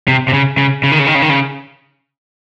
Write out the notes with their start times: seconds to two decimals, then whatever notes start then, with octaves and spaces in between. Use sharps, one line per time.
0.08 C3
0.28 C3
0.33 C#3
0.58 C#3
0.84 C#3
0.92 D#3
0.99 C#3
1.07 D#3
1.15 C#3
1.22 D#3
1.30 C#3